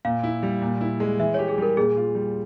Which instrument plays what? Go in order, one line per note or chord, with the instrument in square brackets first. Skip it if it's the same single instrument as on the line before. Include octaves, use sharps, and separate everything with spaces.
[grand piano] A#2 [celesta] F5
[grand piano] E4
G3
A#2
E4
G#3
[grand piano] E3 [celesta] E5
[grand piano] G4 [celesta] C#5
[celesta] G#4
[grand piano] G3 [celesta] A#4
[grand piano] A#2 [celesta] G#4
[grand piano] F4
G3